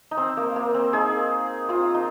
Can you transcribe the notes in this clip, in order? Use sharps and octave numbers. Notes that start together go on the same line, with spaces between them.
D#4
C4
A#3
A#3
C4
D#4 G#4
C4 F4
D#4